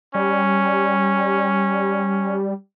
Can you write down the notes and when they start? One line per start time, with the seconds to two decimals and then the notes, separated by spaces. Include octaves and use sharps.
0.15 G3 C#4